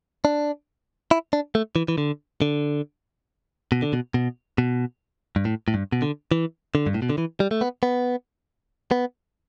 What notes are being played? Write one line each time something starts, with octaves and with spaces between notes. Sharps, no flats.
D4
E4
D4
A3
E3
E3
D3
D3
B2
D3
B2
B2
B2
G2
A2
A2
G2
B2
D3
E3
D3
G2
A2
B2
D3
E3
G3
A3
B3
B3
B3